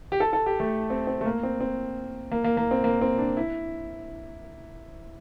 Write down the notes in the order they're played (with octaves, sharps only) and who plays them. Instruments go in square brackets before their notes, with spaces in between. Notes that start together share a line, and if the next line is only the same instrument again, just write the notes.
[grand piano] G4
A4
A4
G4
A3
C4
C4
A3
A#3
C4
C4
A#3
A#3
A#3
C4
A#3
C4
D4
E4